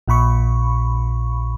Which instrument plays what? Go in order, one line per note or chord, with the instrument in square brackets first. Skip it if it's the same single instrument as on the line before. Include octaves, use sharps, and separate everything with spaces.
[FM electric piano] A#1 A#2 B5 C#6